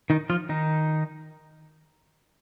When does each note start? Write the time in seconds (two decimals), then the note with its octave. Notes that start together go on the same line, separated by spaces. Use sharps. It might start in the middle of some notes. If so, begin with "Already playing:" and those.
0.10 D#3 D#4
0.30 F3 F4
0.49 D#3 D#4